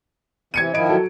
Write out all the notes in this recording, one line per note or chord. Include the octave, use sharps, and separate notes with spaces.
C3 E3 G#6 C#7 D#7
D#3 F3 E4 D#5 D7
F#3 A4